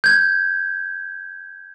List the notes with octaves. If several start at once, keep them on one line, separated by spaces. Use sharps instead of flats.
G6 G#6